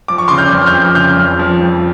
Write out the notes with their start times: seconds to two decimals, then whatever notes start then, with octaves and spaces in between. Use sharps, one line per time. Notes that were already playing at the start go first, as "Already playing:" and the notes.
0.08 F3 D6
0.18 C#6
0.28 C#3 C6 D6
0.38 F6 G6
0.52 F2
0.66 F6 G6
0.74 F2
0.95 C#3 F6 G6
1.17 F2
1.39 F3
1.61 F2